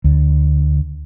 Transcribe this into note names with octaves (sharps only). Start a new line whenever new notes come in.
D2